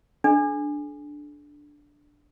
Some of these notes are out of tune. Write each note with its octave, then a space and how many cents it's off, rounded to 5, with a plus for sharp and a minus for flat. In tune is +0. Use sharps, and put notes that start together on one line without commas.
D4 +0 A4 -45